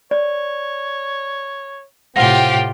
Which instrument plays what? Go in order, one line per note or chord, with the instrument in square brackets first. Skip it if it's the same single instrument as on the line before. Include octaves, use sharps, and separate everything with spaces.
[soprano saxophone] C#5 [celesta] D5
[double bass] A2 C3 [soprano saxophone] C4 [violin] F4 G4 [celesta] F#5 A#6